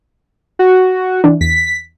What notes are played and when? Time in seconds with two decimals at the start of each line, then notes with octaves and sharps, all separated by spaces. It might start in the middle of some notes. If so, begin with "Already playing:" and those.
0.59 F#4
1.24 E3 D4
1.41 E2 B6